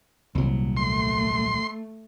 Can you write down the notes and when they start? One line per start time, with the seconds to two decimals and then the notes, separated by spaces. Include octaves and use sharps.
0.35 D#1 C2 F#3
0.77 A3 C6